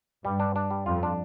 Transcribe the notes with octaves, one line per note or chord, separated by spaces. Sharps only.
G2 G3
D4
D4
G3
F2 F4
D4